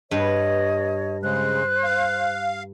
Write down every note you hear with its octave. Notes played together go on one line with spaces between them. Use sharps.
G2 B4 C#5 D#5
C#3 G#3 C5 F#6
F5